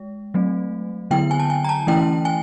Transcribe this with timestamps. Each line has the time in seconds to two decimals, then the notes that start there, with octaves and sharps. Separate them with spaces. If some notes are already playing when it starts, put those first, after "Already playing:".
Already playing: G#3
0.34 F#3 A3 C4
1.11 D3 F#3 B3 E4 G5
1.31 G#5
1.40 A5
1.50 G#5
1.64 A#5
1.69 A5
1.87 E3 A3 C#4 E4 G5
2.25 G#5